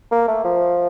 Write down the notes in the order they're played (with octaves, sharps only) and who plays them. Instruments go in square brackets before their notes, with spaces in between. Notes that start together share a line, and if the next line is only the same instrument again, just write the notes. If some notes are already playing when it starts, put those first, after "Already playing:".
[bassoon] A#3
A3
F3